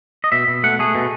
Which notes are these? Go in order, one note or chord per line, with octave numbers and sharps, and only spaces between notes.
D#5
B2 E5
B2
A3 F#5
A3 G#4
B2